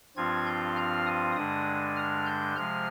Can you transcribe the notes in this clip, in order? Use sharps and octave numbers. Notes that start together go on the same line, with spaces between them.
G2 F3 C4 F4 G#6
G6
F6
D#6
G2 D3 G#3 D4 D#6
F6
G6
C3 F3 G#3 F6